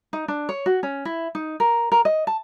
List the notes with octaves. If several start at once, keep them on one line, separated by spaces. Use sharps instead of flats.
D#4
D4
C#5
F#4
C#4
E4
D#4
A#4
A#4
D#5
A5